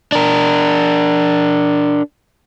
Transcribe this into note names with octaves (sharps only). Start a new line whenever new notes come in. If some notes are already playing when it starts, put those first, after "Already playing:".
D4 A#4